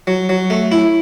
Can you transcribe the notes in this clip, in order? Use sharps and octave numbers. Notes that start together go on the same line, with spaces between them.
F#3
F#3
A3
E4